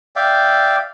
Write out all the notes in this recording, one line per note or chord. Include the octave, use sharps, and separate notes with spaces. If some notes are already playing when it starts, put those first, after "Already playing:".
D5 E5 F5 G5